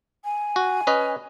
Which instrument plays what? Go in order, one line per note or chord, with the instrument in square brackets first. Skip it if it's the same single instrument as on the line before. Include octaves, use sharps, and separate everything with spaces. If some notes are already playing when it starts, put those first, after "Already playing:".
[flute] G#5
[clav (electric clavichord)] F#4
C#4 B4 D#5